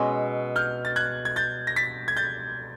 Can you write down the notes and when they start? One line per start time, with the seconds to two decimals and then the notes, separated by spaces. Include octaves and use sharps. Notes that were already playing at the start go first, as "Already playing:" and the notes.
Already playing: B2 G#3 C#4 E6
0.56 F6 G6
0.85 A6
0.96 F#6 G#6
1.25 G#6
1.36 G6 A6
1.67 A#6
1.76 A6 B6
2.08 G#6
2.17 G6 A6